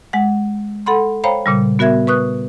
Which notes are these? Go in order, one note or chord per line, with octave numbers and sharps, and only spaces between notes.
G#3 F#5
A4 F#5 B5 C6
C5 C#5 F5 G5 A#5 B5
A#2 C#3 G3
B3 F#4 A#4 E5 G#6
B4 C#6 D#6 F#6